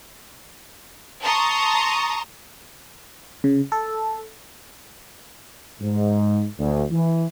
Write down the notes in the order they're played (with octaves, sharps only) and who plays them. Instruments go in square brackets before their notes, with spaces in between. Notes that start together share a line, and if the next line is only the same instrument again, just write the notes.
[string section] A5 A#5 C6 C#6 D#6
[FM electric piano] C#3
A4
[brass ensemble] G#2
D2
E3